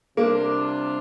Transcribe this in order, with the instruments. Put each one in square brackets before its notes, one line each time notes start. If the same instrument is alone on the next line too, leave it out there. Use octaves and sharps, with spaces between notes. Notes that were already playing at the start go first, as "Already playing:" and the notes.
[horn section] C3 G3 D4 F4 [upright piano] A#3